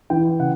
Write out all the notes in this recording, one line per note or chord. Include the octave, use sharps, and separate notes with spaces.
E3 G5
C#3 F#5